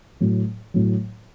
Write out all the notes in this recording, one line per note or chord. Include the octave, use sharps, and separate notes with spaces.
A2 F#3
A2 F#3